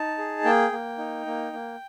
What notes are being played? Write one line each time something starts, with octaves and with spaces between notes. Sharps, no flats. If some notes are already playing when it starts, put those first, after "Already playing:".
Already playing: D#4 A5
G#4
A#3 G5
A#3
D#4
A#3
A#3